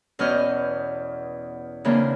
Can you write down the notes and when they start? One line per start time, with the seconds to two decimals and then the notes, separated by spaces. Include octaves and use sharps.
0.19 E2 B2 C#4 D#5 F6 G6
1.85 C#3 E3 A#3 C4 D4